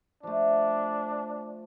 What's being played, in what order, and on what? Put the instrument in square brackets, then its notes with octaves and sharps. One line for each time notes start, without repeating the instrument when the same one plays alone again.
[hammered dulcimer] F3 A3 [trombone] D4